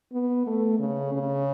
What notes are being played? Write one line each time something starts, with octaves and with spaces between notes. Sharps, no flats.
B3
A3
C#3
C#3